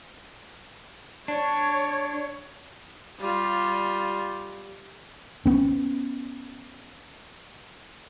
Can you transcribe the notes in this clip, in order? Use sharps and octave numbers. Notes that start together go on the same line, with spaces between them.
D4 C#5
G3 F4
B3 C#4